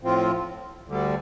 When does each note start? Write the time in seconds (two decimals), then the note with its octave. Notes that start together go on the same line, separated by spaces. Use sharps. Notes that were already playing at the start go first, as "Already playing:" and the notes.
0.02 A2 F3 C4 F4
0.87 D2 D3 G3